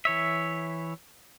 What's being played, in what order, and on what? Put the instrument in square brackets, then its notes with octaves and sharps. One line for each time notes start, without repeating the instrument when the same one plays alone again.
[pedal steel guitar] E3 C#5 E5